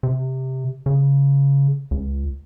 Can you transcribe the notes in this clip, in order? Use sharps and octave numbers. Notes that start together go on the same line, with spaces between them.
C3
C#3
C#2